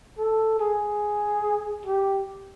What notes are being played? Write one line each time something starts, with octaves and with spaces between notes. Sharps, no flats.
A4
G#4
G4